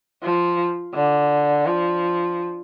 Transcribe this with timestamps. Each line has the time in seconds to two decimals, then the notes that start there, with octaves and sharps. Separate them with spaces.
0.23 F3
0.95 D3
1.67 F3